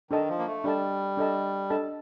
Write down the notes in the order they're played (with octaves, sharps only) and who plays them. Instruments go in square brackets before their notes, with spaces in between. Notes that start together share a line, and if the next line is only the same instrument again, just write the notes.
[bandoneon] D#3 [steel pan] D4 A4 D#5 A5
[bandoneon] F3
A#3
A3
[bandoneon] G3 [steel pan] D4 A4 D#5 A5
[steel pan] D4 A4 D#5 A5
D4 A4 D#5 A5